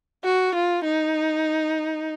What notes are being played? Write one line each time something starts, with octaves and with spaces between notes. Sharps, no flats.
F#4
F4
D#4